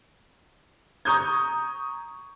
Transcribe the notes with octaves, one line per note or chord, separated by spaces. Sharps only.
A#5 C#6 D#6 G6 G#6